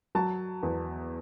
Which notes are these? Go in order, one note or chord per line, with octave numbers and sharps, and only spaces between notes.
F#3 A5
E2